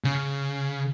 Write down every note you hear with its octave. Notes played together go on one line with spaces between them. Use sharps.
C#3